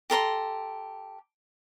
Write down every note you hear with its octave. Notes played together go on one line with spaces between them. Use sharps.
G4 A4 A#5 C6